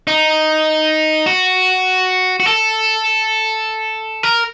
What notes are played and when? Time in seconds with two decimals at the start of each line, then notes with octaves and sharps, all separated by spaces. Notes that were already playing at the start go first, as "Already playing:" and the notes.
0.07 D#4
1.26 F#4
2.40 F#4
2.46 A4
4.23 A#4